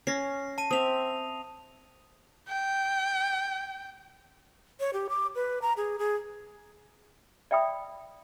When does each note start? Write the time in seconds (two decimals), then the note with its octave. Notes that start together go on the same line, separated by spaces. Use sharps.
0.07 C#4 A#6 C7
0.58 A5 D#7
0.71 C4 E5 D#6 F7
2.49 G5
4.80 C#5
4.93 G4
5.09 D6
5.35 B4
5.62 A#5
5.77 G#4
5.99 G#4
7.51 D5 E5 G5 B5 D#6